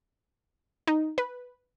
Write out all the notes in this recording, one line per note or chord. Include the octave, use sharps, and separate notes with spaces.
D#4
B4